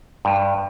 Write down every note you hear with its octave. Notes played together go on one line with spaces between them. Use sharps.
G2